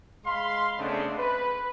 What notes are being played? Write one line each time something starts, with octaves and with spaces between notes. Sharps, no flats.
G#3 F5 B5 C6
C#3 G#3 A3 B3 C4 D4
B4